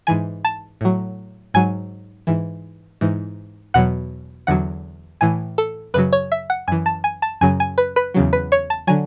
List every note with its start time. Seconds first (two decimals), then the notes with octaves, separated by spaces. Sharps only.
0.07 G#2 E3 G#5
0.45 A5
0.81 A2 F#3
1.54 G#2 F#3 G#5
2.27 G#2 E3
3.01 G#2 E3
3.74 E2 B2 F#3 F#5
4.47 E2 D3 F#3 F#5
5.21 A2 E3 G#5
5.58 A4
5.94 F#2 C#3 F#3 B4
6.13 C#5
6.32 E5
6.50 F#5
6.68 F#2 E3 G#5
6.86 A5
7.04 G#5
7.22 A5
7.41 F#2 C#3 F#3 G#5
7.60 G#5
7.78 B4
7.96 B4
8.14 E2 C#3 F#3
8.33 B4
8.52 C#5
8.70 A5
8.87 D3 F#3 G#5